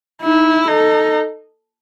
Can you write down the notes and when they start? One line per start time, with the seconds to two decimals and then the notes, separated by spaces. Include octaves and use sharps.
0.22 D#4 E4
0.67 D#4 A4